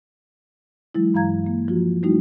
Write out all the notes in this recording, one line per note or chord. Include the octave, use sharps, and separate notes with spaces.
E3 F#3 G#3 E4
G2 E3 F5 A#5 G#6
A#3
F3 F4 F#4
G3 A3 D#4 E4 F#4